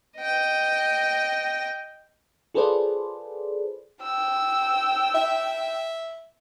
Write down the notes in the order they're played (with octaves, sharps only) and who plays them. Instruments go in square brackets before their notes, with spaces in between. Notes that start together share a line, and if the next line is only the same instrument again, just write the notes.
[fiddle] D#5 G5
[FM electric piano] F4 G#4 A4 B4 C5 D5
[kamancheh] G5 E6
[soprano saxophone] E5